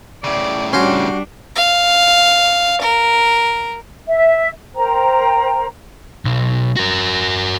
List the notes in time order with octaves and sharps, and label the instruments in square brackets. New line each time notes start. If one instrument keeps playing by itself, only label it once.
[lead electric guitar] A2 C#3 [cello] D5
[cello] G3 D4 [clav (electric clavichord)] C#4 [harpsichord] F#4 C5 C6
[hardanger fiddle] F5
A#4
[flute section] E5
A#4 C5 G5 A#5
[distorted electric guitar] B1
F#4 A#4